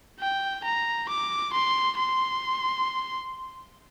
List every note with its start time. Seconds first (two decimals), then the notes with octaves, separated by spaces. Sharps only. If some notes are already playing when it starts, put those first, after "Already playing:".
0.20 G5
0.64 A#5
1.09 D6
1.53 C6
1.98 C6